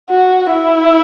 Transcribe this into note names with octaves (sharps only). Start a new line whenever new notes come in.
F#4
E4